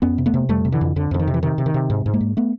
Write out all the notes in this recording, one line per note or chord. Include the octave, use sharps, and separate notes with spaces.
F2 B3 C#4
C3
A3 B3
C3
F2 G3 A3
C3
D3 E3
F2
F2 D3
F2 D3
D#3
C3
E3
C3 D#3
C3
D#3
C3
G#2
G#2
G#3 A#3
G#2
A3 B3